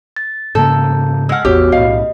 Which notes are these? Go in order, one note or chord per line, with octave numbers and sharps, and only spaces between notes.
A6
G#2 C#3 A#3 A4 G6
G#3 F#5 E6 F6
A1 E2 B3 F#4 G4 C#5
B1 A2 D#5 F5